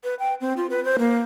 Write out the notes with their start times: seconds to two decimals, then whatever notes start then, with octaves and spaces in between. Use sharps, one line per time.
0.04 B4
0.19 G5
0.41 C4
0.57 F4
0.70 B4
0.85 C5
0.99 A#3